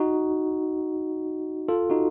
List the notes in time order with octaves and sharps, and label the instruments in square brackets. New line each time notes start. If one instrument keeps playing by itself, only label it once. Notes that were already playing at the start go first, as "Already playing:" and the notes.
Already playing: [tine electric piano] D#4 F#4
F4 A4
D#4 F#4